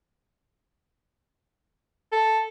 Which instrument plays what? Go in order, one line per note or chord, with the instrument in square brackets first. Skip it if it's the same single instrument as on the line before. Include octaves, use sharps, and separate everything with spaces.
[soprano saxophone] A4